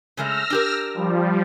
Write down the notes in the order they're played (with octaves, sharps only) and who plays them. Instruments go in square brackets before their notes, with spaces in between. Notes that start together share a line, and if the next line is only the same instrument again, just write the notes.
[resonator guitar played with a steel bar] C#3 G#3 A3 [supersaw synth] E6 F6 A#6
[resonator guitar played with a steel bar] D4 G4 A#4
[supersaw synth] F3 G3